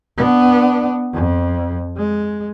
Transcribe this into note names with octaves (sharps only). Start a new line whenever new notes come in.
B3 D4
F2
G#3